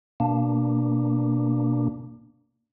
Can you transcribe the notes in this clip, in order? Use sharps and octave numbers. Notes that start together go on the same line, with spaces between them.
B2 A#3 D4